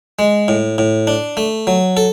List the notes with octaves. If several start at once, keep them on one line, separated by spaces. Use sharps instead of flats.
G#3
A2
A2
D4
A3
F#3
A4